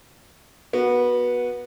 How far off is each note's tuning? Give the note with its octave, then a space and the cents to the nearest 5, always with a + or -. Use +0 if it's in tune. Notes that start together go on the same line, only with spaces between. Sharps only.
B3 -20 F#4 +0